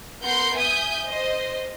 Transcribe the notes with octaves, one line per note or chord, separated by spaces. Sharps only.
B3 A#4 F#5 C6 G6
E5 G#5 D#6 G6
C5 D#5